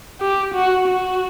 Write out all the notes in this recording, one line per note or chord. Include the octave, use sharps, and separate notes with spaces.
G4
F#4
F#4